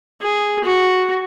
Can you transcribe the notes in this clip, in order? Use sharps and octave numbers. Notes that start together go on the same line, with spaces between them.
G#4
F#4